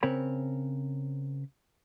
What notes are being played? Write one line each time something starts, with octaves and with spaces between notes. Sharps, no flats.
C#3 C4 A#4 C#5 B5